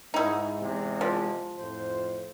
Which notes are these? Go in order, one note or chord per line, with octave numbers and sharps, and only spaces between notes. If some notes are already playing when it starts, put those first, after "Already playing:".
G#2 D#4 E4
E2 C3 G#3
F3
F2 A2 C5